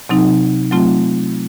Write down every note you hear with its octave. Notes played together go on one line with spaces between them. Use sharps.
C3 F#3 C4 D#4
F#3 A3 C4 F4